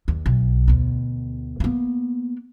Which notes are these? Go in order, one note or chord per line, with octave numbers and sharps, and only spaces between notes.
D#2
B1
D2 B2
A#3 B3